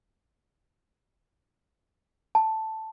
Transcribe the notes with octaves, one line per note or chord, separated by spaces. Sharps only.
A5